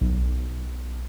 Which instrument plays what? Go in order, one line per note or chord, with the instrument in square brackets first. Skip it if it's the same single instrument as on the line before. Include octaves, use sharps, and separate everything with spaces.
[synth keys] B1